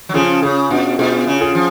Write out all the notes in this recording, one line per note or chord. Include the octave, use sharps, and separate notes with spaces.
F#3
C#3 F3 F4 G#4
C#3 F4 G#4
B2 D4 F#4
B2 F4 G#4
C#3
F4 G#4
F3